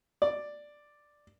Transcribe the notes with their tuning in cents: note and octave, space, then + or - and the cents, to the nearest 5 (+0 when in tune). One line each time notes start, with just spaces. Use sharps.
D5 +5